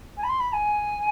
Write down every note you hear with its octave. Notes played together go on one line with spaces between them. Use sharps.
G#5
B5
C6
B5
G#5